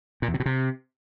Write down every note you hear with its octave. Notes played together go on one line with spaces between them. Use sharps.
A#2
E2
C3
B2
C3